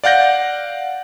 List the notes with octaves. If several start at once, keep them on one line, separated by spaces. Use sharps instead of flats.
D5 F5 F#5 G6 A#6